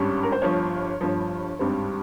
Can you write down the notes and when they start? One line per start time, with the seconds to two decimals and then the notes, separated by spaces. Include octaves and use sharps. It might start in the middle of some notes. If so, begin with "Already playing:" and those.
Already playing: G#1 G2 G3 C#4
0.23 A#4
0.32 C5
0.42 G1 G2 F3 C#5
1.01 G1 G2 F3
1.59 G#1 G2 G3 C4